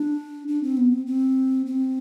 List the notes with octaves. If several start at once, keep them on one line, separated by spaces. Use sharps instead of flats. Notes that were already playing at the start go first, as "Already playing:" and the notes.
Already playing: D4
D4
C4
B3
C4
C4
C4